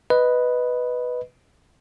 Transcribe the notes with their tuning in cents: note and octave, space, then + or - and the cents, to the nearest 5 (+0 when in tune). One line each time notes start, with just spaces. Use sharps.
B4 +0 D#5 +0